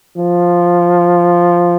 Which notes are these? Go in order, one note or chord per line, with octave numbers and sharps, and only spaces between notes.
F3